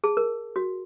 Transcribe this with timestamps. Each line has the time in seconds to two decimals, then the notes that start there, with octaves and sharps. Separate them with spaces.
0.04 G#4 A5
0.17 A#4
0.56 F#4